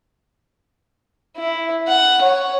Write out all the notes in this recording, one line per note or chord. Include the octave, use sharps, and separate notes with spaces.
E4
F#5
C#5